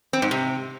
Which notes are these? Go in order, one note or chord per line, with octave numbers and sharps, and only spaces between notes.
C4
G#2
C3